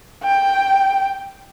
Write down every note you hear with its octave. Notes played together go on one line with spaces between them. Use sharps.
G5